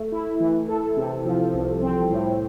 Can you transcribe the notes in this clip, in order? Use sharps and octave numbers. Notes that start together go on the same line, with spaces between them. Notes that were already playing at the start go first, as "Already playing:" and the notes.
Already playing: A3
E4
E3
A4
C3
F3
C2
C4
A2